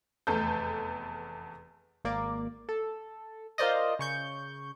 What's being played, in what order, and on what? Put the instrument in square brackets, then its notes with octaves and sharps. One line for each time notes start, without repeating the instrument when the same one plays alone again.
[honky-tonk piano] F1 E2 A4 G6
[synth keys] G#1 A#3 D5
A4
F4 A#4 C5 D5 D#5
C#3 C#6 G6